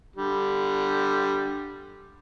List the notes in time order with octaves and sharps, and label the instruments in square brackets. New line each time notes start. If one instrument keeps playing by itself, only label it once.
[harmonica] D3 G3